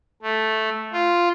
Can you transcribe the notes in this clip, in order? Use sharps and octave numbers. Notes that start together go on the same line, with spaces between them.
A3
F4